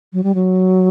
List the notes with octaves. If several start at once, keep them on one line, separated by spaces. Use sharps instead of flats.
F#3
G3
F#3